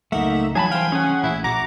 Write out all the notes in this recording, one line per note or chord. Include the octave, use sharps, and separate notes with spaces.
C#2 F#3 A3 A#3 D#4 E5 F#5
E3 F#3 G3 D4 G#4 G#5 A5 B5
C5 F5 G5
C#4 G#4 F#5
A1 A#2 E4
A#1 F#4 A#5 D6